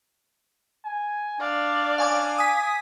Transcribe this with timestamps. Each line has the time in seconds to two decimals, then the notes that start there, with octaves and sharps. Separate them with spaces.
0.84 G#5
1.41 D4 D5 F5
1.98 C#4 F5 G#5 D6
2.38 G#5 D#6 B6